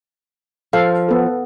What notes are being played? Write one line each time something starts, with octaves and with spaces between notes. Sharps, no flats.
F3 A4 F5
B3 A4